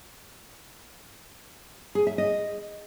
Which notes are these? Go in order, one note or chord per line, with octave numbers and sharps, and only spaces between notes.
G#4
E5
D#5